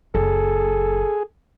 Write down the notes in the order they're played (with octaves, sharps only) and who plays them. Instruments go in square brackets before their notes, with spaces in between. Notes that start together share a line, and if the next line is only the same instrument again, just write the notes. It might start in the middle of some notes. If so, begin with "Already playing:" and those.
[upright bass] F#1 [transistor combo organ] G#4 [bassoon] A4